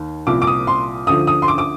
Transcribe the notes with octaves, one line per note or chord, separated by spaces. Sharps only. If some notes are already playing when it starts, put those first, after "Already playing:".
Already playing: D#2 D#3
C2 A#2 F3 D6
D6
D#6
C6
D2 D3 F3 D#6
D#6
C6
D6
D6